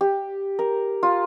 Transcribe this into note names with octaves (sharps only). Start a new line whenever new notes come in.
G4
A#4
F4